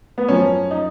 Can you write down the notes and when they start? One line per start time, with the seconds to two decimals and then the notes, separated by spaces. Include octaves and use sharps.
0.18 B3
0.28 F#2 F3 C#4
0.71 D#4